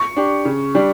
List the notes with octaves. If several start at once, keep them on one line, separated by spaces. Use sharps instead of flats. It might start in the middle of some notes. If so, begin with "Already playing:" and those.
Already playing: C#6
D4 G4
C#3
G3 D4 G4